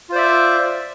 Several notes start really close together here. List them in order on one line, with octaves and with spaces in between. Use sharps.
F4 C5 D5 E5